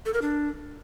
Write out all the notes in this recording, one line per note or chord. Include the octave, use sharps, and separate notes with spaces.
A4
A#4
D4